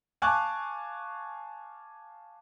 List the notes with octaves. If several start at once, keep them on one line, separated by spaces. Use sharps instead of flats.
F5 G#5 A5 C#6 D6 F#6